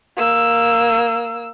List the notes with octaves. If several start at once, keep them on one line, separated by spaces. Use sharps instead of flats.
A#3 E6